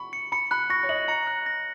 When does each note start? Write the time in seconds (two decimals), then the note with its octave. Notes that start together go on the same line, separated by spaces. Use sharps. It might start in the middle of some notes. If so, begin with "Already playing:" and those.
Already playing: B5 C#6
0.13 C#7
0.32 B5 C#7
0.51 B5 F#6
0.70 C#6 A#6
0.83 C#5
0.89 D#5 F#7
1.08 A#5 C#7
1.27 F#6
1.46 A#6